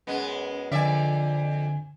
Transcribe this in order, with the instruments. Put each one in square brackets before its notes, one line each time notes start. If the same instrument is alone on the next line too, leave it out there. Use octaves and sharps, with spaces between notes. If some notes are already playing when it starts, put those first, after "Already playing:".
[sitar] F#2 G#3 B3
[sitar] F2 D5 E5 [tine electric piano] D3 G#5